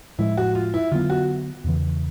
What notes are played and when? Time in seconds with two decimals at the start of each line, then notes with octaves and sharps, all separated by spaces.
0.19 A2 F3 G#3 E4
0.37 F#4
0.55 F4
0.74 E4
0.92 D3 F#3 B3 F4
1.10 F#4
1.64 E2 C#3 E3